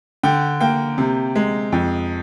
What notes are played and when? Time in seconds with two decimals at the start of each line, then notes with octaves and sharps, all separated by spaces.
0.23 D3 G5
0.61 A#3 G5
0.98 C3
1.36 G#3
1.72 F2